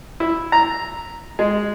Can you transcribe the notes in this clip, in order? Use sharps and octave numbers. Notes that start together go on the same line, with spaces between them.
E4
A#5
G#3